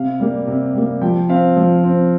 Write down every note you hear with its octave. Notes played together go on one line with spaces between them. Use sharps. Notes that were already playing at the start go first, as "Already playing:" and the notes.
Already playing: C3 F5
G3 A#3
C3
G3 A#3
F3 G5
C4 F5
F3
C4